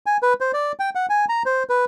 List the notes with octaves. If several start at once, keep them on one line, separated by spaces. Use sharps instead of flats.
G#5
B4
C5
D5
G5
F#5
G#5
A#5
C5
B4